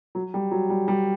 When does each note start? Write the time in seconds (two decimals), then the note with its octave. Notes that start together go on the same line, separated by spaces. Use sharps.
0.15 F#3
0.34 G3
0.51 F#3
0.70 G3
0.88 G3